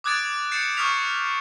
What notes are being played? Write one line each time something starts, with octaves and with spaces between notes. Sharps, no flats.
D6 D#6 F#6 G#6 A6 D7
G6 A6 C7 C#7 E7
C#6 D#6 F6 G6 B6 F7